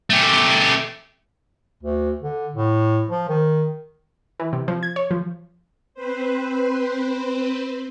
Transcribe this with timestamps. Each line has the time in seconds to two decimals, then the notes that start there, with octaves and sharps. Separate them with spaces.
0.10 A3 G4
1.83 D2
2.22 D3
2.55 A2
3.09 F3
3.29 D#3
4.40 E3
4.53 C3
4.68 F3
4.83 G#6
4.96 C#5
5.11 F3
5.94 C4 B4 C5